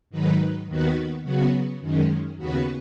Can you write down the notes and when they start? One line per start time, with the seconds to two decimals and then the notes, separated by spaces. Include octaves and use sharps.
0.10 G#2 D#3 F#3 D#4 B4
0.66 D#2 D#3 B3 F#4 B4
1.23 C#3 F#3 B3 F#4
1.80 F#2 D#3 G#3 C#4
2.37 D#2 C#3 B3 F#4 B4